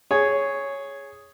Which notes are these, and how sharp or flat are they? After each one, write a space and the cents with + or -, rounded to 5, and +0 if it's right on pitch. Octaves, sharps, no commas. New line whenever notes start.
G#4 +0 C#5 +0